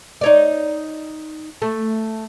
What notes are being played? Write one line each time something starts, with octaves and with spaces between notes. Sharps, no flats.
D#4 C#5 D5
A3